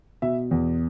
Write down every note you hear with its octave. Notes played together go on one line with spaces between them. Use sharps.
B2 E5
E2